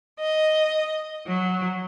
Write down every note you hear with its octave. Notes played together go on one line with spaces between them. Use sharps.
D#5
F#3